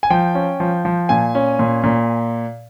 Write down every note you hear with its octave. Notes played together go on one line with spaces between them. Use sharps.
G#5
F3 G5
C#4
F3
F3
A#2 G#5
C#4
A#2
A#2